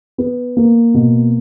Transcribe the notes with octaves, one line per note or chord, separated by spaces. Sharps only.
B3
A#3
B2